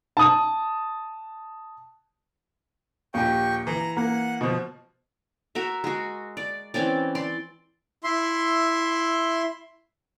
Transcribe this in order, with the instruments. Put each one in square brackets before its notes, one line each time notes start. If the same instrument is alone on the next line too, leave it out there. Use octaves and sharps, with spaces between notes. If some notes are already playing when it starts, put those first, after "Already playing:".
[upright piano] A5 D#6
[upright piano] D#1 G4 [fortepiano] A#1 [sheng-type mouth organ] G5 C#6
[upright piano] E3 [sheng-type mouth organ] A#5
[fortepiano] A#3 [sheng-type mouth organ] F#5
[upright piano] B2 F3
[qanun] F#4 A#4 E5
G#3 F#4
D5
E3 C4 C#4 D5
D5 C6
[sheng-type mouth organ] E4 E5 C6